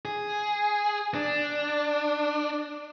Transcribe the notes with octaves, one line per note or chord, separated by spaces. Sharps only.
G#4
D4